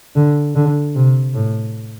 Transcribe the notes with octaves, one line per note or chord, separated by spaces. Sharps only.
D3
D3
C3
A2